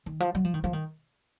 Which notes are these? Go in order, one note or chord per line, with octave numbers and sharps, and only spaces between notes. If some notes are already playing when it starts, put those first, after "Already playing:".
D#3
F3
F#3
F3
D#3
F3
D#3